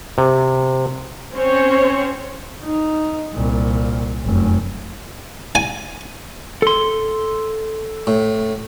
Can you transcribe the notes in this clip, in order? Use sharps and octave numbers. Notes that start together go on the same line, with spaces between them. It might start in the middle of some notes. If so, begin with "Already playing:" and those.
C3
C4 C#4 C5 C#5
D#4
C2 A#2
F1 F#2
G#5
A4 C6
A2